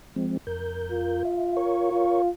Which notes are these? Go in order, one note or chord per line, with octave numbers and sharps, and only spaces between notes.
F3 G#3 C4
F2 A#4 G6
F4
E5
A#4 C#5 C#6
F4